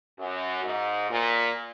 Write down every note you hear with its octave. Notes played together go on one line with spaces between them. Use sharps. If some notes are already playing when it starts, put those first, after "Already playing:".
F#2
G#2
A#2